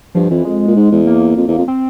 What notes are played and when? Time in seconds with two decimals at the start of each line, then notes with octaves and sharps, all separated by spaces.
0.15 G2 F3
0.30 F2 E3
0.45 F2 G#3
0.68 A#2
0.76 G#2
0.92 E2
1.06 A#3
1.37 F2
1.48 E2
1.58 F2
1.68 C4